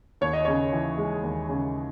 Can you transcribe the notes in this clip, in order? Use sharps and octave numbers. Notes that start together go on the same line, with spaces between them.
D#2 C#5
D#5
C#3 C#5
E3
G#3
D#2
C#3